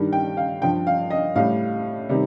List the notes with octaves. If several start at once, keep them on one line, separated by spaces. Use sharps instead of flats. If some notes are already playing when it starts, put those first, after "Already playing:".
Already playing: G2 D#3 G3
G5
F5
G2 F3 G5
F5
D#5
A2 G3 F5
C3 D#3 G3